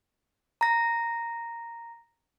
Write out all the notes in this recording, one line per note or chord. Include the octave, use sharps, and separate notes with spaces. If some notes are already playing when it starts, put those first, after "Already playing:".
A#5 A#6